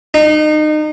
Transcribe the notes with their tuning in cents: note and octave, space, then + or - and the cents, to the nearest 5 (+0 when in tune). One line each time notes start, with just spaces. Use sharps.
D#4 -30